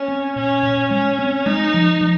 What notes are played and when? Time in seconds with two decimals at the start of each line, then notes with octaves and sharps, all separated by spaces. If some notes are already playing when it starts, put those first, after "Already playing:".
Already playing: C#4
0.08 C4
0.36 A#2 C#4
0.63 A#2
0.91 G#3 C#4
1.19 C4
1.46 G#3 D#4
1.74 F3
2.01 F3